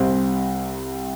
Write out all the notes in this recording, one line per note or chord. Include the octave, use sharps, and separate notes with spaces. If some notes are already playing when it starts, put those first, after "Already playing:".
Already playing: C2 C3 G3 C4